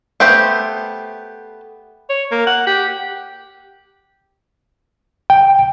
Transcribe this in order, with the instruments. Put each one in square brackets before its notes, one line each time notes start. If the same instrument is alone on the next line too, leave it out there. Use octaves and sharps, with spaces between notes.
[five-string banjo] A3 B3 G4 C5
[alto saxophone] C#5
A#3
F#5
G4
[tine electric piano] G5